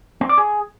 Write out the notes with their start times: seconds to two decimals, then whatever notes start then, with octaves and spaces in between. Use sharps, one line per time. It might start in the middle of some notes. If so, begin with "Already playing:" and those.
0.21 C4
0.29 D5
0.38 G#4